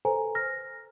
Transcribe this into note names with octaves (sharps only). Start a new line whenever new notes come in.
A4 B4 C5 G#5 A#5
F6 A#6